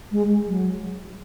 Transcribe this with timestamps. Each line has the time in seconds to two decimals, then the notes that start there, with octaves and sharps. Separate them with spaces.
0.12 G#3
0.47 F#3